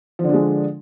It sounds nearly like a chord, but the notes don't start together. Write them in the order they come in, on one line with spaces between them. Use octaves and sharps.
F3 D3 D4 G#3